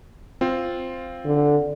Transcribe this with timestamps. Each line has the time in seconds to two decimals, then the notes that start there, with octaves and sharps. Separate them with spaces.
0.41 C4 F4
1.25 D3